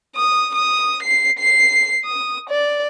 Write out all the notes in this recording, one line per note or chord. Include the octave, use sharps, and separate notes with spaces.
D#6
D#6
C7
C7
D#6
D5